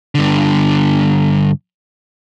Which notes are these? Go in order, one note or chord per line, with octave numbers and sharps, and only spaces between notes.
G2 D3